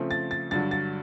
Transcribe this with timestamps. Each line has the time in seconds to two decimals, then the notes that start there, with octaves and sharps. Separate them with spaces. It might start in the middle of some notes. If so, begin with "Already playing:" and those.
Already playing: C#3 F3 A3 C4
0.11 A6
0.31 A6
0.51 G2 D3 F#3 A6
0.71 A6